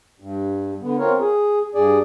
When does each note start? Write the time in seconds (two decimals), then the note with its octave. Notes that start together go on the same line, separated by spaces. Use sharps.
0.20 G2
0.81 D3 B3
0.99 C4 F4 A#4 C#5
1.20 G#4
1.75 G2 G#4 D5